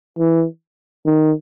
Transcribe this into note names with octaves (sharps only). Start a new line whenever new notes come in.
E3
D#3